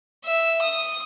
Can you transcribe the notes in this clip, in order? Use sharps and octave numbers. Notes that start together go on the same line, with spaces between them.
E5
D#6